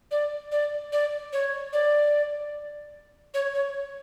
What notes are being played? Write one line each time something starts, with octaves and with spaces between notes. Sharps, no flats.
D5
D5
D5
C#5
D5
C#5
C#5